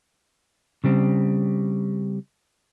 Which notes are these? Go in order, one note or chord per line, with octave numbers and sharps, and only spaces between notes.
C#3 G3 C4